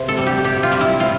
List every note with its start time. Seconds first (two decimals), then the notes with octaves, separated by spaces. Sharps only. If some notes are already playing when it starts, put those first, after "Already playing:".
Already playing: C3 C5
0.08 A4
0.18 G3
0.27 G4
0.44 C3 G4
0.63 F4
0.72 G3
0.81 E4
0.99 C3 F4